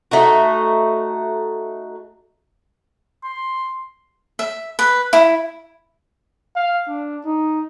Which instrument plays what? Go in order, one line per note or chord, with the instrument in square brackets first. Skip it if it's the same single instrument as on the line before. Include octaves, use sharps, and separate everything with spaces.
[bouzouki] A3 D#4 F#4
[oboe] C6
[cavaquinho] E5
B4
E4
[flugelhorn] F5
D4
D#4